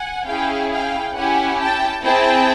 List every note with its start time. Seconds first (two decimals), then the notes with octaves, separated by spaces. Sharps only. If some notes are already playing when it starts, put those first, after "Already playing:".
Already playing: F#5 G#5
0.26 C#4 E4 G#4 F5 G5
0.71 F5 G5
1.15 C#4 E4 G4 F#5 G#5
1.60 G5 A5
2.04 C4 E4 G#4 G5 A5